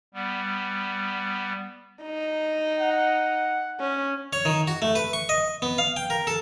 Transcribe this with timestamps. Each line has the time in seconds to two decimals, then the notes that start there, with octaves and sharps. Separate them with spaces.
0.14 G3 B3
2.03 D#4
2.79 F#5
3.80 C#4
4.33 C#5
4.45 D#3
4.67 F#4
4.82 A3
4.95 B4
5.13 C#6
5.29 D#5
5.62 B3
5.78 F5
5.97 G5
6.10 A#4
6.27 A4